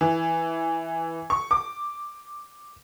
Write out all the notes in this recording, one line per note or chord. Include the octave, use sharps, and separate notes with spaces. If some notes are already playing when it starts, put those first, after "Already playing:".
E3
C#6
D6